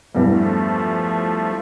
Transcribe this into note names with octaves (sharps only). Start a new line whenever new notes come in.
E2 G2 F3 A3